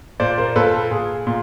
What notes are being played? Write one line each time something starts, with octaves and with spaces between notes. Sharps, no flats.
A#2 C5 D5
A#4 C5
A#2 A4 B4
A4
A#2 G#4
A#2